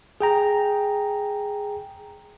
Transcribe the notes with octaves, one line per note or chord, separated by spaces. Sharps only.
G#4 G5 A#5